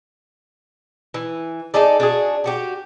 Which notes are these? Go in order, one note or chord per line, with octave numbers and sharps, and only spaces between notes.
E3
D#4 G#4 A4 D5
D4 F#4 G#4
D4 F#4 G4